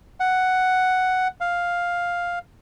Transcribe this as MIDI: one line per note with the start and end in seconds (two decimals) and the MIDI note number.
0.20 1.28 78
1.41 2.39 77